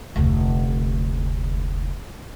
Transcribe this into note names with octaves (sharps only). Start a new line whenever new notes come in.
F1 D2